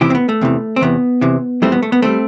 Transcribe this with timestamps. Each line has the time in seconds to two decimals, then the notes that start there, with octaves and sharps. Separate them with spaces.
0.01 E2 C3 E3 E4 G4
0.10 C4
0.15 B3
0.29 A3
0.41 E2 C3 E3
0.76 C4
0.81 E2 C3 E3 B3
1.21 E2 C3 E3
1.62 F2 E3 G3 A3 C4
1.72 B3
1.82 A3
1.92 B3
2.02 E3 G3 A3 C4